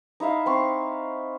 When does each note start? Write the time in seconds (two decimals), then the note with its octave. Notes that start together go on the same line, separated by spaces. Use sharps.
0.20 D#4 E4 E5 F5
0.46 C4 C6 C#6